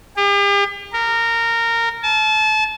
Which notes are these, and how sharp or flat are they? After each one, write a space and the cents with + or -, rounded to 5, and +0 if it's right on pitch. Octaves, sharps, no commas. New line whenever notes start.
G4 +45
A#4 -15
A5 -30